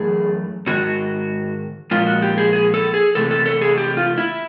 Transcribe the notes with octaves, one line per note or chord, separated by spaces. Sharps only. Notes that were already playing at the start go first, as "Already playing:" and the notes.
Already playing: F#2 E3 A3 G#4
G#2 D#3 F#4
A#2 F3 G#3 F4
F#4
G4
G#4
G#4
A4
G#4
C3 E3 A3 A4
A4
A4
G#4
G4
F4
E4